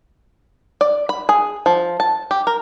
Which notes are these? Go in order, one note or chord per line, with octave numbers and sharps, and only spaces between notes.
D5
B5
G#4
F3
A5
G4
A#4